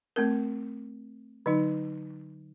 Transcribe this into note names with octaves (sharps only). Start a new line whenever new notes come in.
A3 C4 A#4
D3 F#3 D#4